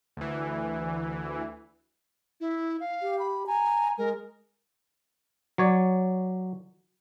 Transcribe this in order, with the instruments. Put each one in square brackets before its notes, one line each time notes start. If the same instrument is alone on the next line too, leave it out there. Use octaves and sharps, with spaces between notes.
[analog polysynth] D2 E3
[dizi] E4
F5
[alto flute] G4
[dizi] B5
[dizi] G#5 [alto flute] A#5
[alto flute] G#3 [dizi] A#4
[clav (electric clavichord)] F#3 C#5 D5